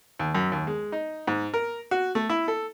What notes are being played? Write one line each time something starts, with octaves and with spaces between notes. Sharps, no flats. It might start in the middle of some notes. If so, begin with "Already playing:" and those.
D#2
F#2
D#2
G#3
D#4
G#2
A#4
F#4
A3
E4
A4